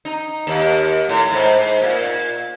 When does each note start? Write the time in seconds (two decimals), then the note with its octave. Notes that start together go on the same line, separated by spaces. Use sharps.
0.05 D#4
0.47 D#2
1.09 A2
1.32 G#2
1.82 A#2